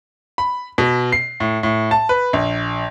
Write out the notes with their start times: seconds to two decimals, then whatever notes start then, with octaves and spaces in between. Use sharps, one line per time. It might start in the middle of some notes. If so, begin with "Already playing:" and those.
0.38 B5
0.78 B2
1.12 C7
1.40 A2
1.63 A2
1.91 A5
2.09 B4
2.33 A#1